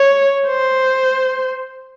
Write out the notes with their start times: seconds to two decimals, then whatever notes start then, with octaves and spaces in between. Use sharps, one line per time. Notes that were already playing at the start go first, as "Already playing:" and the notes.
Already playing: C#5
0.47 C5